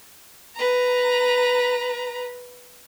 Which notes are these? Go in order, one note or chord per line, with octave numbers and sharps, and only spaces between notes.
B4 A#5